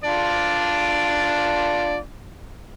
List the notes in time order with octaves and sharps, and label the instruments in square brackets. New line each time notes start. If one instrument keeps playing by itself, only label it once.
[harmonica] D4 F4 D5